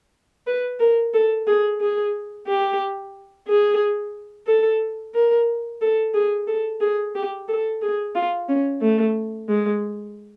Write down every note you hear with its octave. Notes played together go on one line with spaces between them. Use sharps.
B4
A#4
A4
G#4
G#4
G4
G#4
A4
A#4
A4
G#4
A4
G#4
G4
A4
G#4
F4
C#4
A3
G#3